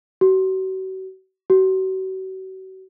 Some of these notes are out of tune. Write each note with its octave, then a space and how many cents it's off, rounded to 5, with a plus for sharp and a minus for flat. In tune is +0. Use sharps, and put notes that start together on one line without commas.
F#4 +40
F#4 +40